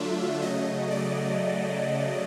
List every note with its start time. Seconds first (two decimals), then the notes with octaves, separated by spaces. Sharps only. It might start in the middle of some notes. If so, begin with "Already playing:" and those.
Already playing: D3 F#3 A3 D4 F4 E5
0.42 C#3 F#3 A3 D#5
0.91 D5